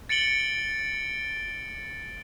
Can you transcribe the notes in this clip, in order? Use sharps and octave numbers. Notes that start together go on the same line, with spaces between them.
A6 C#7 D7 F#7 G7